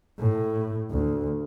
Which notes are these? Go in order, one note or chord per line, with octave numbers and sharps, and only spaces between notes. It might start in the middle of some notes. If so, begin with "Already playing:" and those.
A2
D2